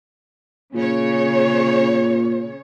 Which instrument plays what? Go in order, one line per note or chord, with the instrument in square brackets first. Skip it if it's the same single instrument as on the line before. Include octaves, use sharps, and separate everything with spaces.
[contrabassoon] A#2 [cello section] C#3 C#5